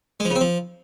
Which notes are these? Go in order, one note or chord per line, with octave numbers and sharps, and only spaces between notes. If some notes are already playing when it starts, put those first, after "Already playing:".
G#3
F3
C#3
C4
F3